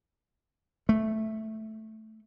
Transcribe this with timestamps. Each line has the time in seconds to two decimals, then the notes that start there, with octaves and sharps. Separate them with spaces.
0.89 A3